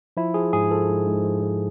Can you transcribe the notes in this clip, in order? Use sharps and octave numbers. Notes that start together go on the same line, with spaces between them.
F3 E4
F3 G#4
G#2 G#4
F3 A4
G#2
G#2
F3
F3